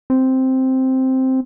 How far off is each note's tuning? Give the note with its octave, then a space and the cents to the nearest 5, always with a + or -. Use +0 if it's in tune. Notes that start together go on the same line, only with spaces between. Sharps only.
C4 +0